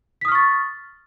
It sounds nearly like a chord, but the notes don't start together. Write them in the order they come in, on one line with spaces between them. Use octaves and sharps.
B6 D#6 F6 C#6 A6